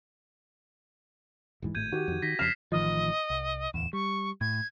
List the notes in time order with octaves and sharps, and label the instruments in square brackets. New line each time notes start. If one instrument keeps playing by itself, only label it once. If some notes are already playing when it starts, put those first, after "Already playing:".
[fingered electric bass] D#1 G#2 E3
[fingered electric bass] G#1 A2 [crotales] G6 G#6 D#7
[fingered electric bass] D#3 [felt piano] F#4 G4
[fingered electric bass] F2 D#3
[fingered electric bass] D#3 [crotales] A#6 B6
[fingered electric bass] F2 C#3 [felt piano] F6 [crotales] B6 C7 E7
[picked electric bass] A1 D#3 F3 [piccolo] D#5
[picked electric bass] C2
[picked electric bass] D1 E2 [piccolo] E7
[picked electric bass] G3 [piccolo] C#6
[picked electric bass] A2 [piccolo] G#6